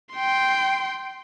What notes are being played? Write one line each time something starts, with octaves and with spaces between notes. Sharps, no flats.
G5 C6